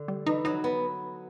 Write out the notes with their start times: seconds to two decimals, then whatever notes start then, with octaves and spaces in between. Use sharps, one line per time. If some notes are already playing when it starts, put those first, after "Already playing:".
Already playing: D3
0.08 G3
0.27 E3 D#4
0.45 F#3 D#4
0.64 B3